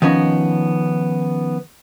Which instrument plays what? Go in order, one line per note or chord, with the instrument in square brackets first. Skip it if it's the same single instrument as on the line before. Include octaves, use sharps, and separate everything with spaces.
[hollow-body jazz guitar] D#3 F3 B3 C#4 D#4